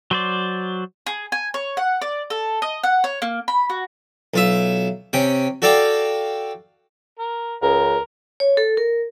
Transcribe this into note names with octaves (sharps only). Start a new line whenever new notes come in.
F#3 C5 D5
G#4
G#5
C#5
F#5
D5
A4
D#5
F#5
C#5
A#3
B5
F#4
B1 F4 E5
C3 C#4 G5
F#4 A4 D5 F5 G5
A#4
C#2 A#4
C#5
A4
A#4